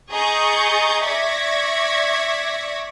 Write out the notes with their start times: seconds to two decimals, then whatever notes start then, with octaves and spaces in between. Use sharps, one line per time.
0.11 G#4 D#5 A#5 C#6 G6 A6
1.03 D5 E5 C#6 G#6 A#6 B6